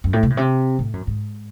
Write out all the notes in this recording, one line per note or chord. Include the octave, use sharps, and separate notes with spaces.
F#2
A2
C3
A2
C3
A2
F#2
G#2